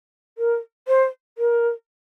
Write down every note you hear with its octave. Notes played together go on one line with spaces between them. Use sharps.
A#4
C5
A#4